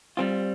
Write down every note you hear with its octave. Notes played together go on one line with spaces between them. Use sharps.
G3 C4 F4